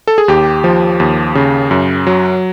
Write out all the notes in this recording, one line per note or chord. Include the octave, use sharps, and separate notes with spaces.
A4
G#4
D#2 G4
F3
D#2
C#3
F#2
F#3